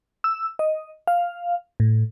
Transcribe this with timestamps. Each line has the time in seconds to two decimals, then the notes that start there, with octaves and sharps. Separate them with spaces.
0.24 E6
0.59 D#5
1.07 F5
1.80 A2